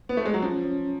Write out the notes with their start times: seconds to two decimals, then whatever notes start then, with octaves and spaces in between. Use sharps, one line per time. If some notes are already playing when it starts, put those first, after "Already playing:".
0.09 B3
0.17 A3
0.25 G#3
0.34 F#3
0.42 F3 C#4
0.65 C#4